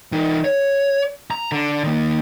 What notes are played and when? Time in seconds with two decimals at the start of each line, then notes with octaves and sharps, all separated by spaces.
0.12 E3 D#4
0.44 C#5
1.31 A#5
1.52 D3
1.84 D#3 A#3